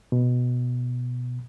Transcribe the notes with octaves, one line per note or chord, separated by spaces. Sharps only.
B2